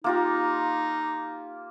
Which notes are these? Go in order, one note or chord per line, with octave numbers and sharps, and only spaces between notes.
A#3 D#4 F4 G4